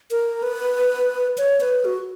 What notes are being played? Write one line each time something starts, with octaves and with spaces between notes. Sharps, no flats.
A#4
B4
C#5
B4
F#4